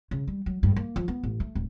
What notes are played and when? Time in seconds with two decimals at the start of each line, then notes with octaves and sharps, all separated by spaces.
0.11 C#3
0.27 G3
0.46 F#3
0.63 G2
0.76 A#3
0.96 F3
1.08 B3
1.23 A1
1.40 A3
1.55 D1